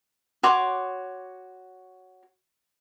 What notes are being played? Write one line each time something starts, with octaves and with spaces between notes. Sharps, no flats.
F#4 C#5 C6 D6